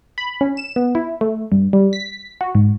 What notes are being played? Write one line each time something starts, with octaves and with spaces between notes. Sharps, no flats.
B5
C#4
E7
B3
E4
A3
G2
G3
B6
F#4
G#2